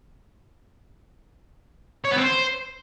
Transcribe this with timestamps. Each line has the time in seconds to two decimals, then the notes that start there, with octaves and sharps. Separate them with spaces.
2.04 C#5
2.11 B3
2.17 C4
2.24 C5